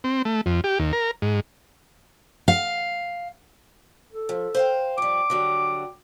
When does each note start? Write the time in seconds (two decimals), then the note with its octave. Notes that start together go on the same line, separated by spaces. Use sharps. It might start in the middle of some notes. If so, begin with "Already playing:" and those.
0.04 C4
0.25 A3
0.46 F2
0.64 G4
0.79 D#2
0.93 A#4
1.22 G#2
2.48 F5
4.12 A4
4.29 F3
4.54 C5 F5 G5
4.98 F2 G3 D6
5.30 D3 F#3 G3